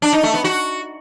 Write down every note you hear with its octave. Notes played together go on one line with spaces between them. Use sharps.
D4
D#4
A3
B3
F#4